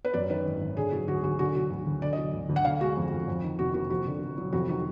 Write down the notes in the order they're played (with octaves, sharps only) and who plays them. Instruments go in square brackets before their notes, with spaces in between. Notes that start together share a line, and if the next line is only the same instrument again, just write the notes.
[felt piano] B4
F#2 D5
D#3 B4
G#1
G#1
D3 G#4
F#3
D2 F#4
D2 F#4
D3 F#4
F#3 F#4
D2
D2
D3 D5
D#5
F#3
D2
D2
F#5
D3 F5
G#3 F#4
F2
F2
F2
D#3
F1 F#4
A#3 F#4
F2 F#4
D3
F1
F#3
F2 F#4
D#3 F#4